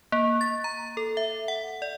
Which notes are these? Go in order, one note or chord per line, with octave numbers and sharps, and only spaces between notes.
A#3
A6
A#5
A4
E5
F#5
D5